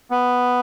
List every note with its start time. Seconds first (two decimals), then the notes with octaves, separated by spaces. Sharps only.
0.11 B3